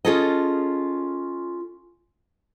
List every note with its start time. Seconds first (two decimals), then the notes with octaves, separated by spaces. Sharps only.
0.05 C#4 F4 G#4 A4 C#5 D#5